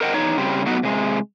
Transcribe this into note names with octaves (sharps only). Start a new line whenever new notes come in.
A#4 C5 D#5 F#5 G5
E2 D#4 C#5
C#3 G3 C4
F#3 A3 B3 D#4 F#4
C3 G#3